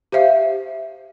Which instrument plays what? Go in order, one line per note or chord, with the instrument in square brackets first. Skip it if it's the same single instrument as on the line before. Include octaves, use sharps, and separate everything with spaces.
[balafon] G4 C5 E5 F5